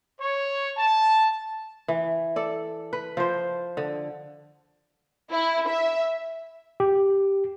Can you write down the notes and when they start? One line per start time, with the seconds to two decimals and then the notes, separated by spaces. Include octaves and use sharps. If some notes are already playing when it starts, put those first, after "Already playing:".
0.20 C#5
0.77 A5
1.88 E3
2.36 A4 D5
2.93 B4
3.17 F3 C5
3.77 D3
5.32 E4
5.69 E5
6.80 G4